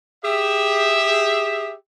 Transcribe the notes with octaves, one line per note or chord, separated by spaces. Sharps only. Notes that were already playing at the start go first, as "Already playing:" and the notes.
G4 G#4 E5